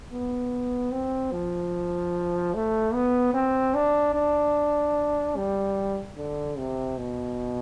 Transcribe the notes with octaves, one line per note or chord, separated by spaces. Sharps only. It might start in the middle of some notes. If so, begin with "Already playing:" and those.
B3
C4
F3
A3
B3
C4
D4
D4
G3
D3
C3
B2